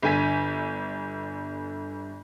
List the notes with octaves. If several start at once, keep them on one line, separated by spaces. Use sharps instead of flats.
G1 D3 G#5 B6